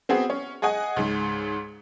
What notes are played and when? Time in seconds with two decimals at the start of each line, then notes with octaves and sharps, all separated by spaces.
0.09 B3 C4 F#4 G#4
0.30 C#4
0.62 G#4 D#5 F#5 G#5
0.96 C#2 G#2